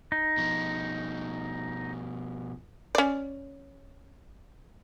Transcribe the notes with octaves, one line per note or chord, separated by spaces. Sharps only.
D#4
B2 F3
C#4 D5